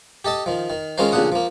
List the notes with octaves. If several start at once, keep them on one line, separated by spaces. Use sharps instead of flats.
G4 A4 D#5 A5
D#3 F3
D#3
D#3 G#3 C#4 F4 A#4 C5
A1 A#2 C#3 D4 F#5 D#6
F3 A#3